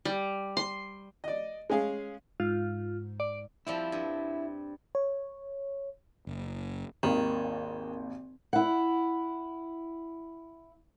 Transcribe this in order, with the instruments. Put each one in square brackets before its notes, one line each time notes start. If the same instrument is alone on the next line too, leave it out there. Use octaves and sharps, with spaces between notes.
[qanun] G3
C6
[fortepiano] D5 D#5
G#3 C#4 G#4 F5
[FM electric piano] G#2 [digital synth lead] F4
[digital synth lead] D5
[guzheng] F3 G3 C4 [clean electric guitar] E4
[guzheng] G2
[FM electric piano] C#5
[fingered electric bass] F#1
[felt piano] G#1 D#2 [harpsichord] D#3
[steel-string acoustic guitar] E4 F#5